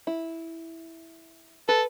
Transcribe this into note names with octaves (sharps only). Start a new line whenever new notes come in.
E4
A4 B4